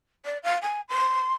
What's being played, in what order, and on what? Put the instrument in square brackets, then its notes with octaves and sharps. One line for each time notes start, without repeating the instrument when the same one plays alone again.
[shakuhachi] D5
F5
G#5
C6